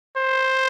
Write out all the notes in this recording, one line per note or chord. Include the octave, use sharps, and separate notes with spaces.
C5